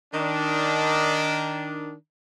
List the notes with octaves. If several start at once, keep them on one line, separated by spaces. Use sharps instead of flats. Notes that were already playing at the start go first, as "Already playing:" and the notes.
D#3 D4